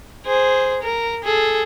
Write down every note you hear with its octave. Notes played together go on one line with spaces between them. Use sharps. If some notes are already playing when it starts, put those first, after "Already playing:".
G#4 C5
A#4
G#4 A4